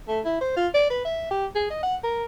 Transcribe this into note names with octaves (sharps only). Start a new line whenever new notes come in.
A3
E4
C5
F4
D5
B4
E5
G4
G#4
D#5
F#5
A#4